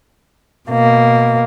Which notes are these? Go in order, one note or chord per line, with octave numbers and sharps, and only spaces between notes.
B2 A#3